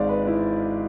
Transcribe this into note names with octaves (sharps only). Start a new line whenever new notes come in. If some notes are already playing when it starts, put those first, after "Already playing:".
Already playing: G#1 G#2 G#3 D5 F5
B4
E4